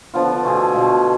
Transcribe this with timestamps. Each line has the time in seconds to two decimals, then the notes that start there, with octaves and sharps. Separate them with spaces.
0.14 D3 F3 B3 F4
0.43 B2 A3 F4 G#4
0.74 B2 A3 F4 G#4